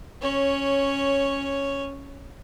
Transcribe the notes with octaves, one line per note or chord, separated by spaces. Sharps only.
C#4 C#5